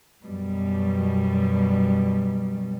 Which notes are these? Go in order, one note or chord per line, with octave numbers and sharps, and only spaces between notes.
F#2 B2 G3